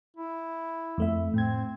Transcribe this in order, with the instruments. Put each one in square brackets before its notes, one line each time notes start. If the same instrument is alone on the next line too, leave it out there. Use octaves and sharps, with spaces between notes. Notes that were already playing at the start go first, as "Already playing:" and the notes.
[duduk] E4
[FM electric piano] F2 A3 E5
[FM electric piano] A2 G#6 [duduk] C4